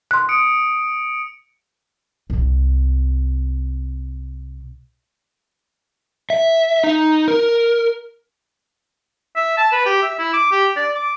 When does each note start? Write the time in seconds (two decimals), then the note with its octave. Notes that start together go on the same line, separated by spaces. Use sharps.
0.11 C6 F#6
0.29 D#6 C#7 D7
2.30 C2 C3
6.30 E5
6.84 D#4
7.28 A#4
9.36 E5
9.57 A5
9.72 B4
9.86 G4
10.02 E5
10.19 E4
10.33 D6
10.51 G4
10.76 D5
10.95 D6